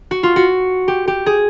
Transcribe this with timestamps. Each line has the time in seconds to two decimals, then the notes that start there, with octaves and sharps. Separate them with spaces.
0.11 F#4
0.23 F4
0.36 F#4
0.88 G4
1.08 G4
1.26 G#4